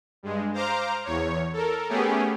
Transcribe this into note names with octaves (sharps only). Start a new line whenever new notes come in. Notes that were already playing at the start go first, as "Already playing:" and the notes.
G2 G#3
C5 F5 A#5 D6
E2 C#5
A4 A#4
A3 B3 C#4 G4 G#4